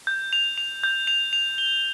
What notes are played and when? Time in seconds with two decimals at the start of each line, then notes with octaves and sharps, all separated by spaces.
0.07 G6
0.33 F7
0.58 F7
0.84 G6
1.07 F7
1.33 F7
1.58 G7